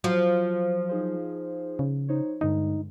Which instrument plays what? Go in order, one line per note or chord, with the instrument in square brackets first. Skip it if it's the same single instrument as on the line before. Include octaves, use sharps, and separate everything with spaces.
[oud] F3 [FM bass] F#3
[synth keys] D#4 G#4 C5
[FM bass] C#3
[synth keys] D#4 C5 C#5
[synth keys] G2 D3 G#3 [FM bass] D#4